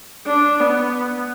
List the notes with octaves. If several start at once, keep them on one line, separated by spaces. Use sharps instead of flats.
D4
B3